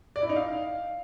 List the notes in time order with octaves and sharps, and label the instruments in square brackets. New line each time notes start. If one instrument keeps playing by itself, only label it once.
[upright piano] D5
E4
D#4
F5